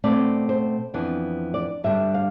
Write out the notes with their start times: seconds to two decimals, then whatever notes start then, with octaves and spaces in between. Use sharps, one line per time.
0.04 B2 A3 C4 D5
0.49 C5
0.94 F2 E3 B3 D4
1.54 D5
1.84 G2 D3 G3 D4 E5
2.14 F5